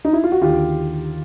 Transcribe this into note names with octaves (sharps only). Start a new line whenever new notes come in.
D#4
E4
F4
F#4
D#2 D3 F4 G4